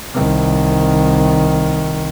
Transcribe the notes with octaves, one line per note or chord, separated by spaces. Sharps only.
C2 D#3